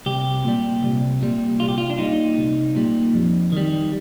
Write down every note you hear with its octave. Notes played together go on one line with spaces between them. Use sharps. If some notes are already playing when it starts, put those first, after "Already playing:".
C2 G4
A#2 G3
C2
A#2 G3
C2 F4
G4
F4
D4
A#2 G3 D#4
C2
A#2 G3
F2
D#3 G3